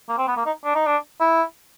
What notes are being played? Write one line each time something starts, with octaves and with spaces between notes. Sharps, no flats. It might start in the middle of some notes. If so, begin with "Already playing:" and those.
A#3
C4
B3
A#3
D#4
D4
D#4
D4
E4